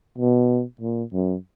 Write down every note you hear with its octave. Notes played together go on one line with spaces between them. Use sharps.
B2
A#2
F#2